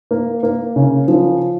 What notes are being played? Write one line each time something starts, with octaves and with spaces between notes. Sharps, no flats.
A#3
A#3
C#3
F3